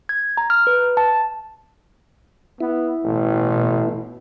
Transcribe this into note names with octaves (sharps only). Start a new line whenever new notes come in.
G#6
A#5
F6
B4
A5
B3 E4
A1 B2